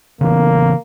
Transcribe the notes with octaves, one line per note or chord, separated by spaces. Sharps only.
C#3 E3 A#3 B3